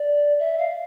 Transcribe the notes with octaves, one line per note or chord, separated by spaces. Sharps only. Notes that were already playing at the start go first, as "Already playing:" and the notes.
Already playing: D5
E5
F5